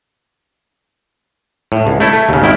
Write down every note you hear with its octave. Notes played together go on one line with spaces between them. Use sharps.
A2
C#2
A3 E4 A4
A3
D#2 C#3
G#1 D#3 E4 G5